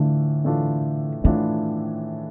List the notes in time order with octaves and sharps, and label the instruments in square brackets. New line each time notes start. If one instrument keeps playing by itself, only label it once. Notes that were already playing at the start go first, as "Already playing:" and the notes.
Already playing: [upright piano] A2 E3 A3 D4 F4 [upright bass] D3
[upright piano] A2 E3 A3 D4 F4
[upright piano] A2 E3 A3 D4 F4 [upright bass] D#3